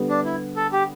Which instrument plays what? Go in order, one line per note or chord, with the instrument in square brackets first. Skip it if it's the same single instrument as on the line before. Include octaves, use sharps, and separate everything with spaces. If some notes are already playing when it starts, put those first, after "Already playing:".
Already playing: [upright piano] D3 G3 B3
[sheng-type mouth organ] D4
E4
A4
G4